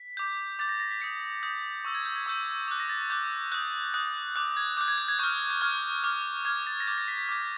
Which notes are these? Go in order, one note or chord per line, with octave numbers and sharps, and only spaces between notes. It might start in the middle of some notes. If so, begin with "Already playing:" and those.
Already playing: B6
D6 G6
D6 G6 A6
A#6
A#6
B6
D#6 G6 C#7
D#6 G6
C#6 E6 G6
G#6
G6
G#6
C#6 E6 G6
D6 F#6
A#6
A6
D6 F#6 G6
D#6 F#6 G6
D#6 F#6
D6 F#6
G#6
D6 F#6 G6
G#6
G6
G#6
C#6 F6 G6
G6
C#6 F6 G#6
D6 F6
D6 F6 G#6
A6
A#6
D6 G6 A6
A#6
B6
B6
D6 G6